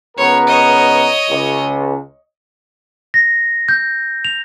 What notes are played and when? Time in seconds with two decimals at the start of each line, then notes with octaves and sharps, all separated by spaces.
0.18 C#2 B3 A#4 C#5
0.47 C#5 D#5
1.29 C#2
3.14 A#6
3.69 G6
4.25 F7